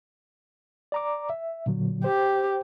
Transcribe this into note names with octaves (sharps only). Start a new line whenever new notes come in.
D5 A#5 D6
E5
A#2 D3 F#3
G4 C5